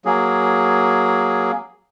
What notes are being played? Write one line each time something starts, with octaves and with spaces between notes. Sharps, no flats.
F#3 A#3 G#4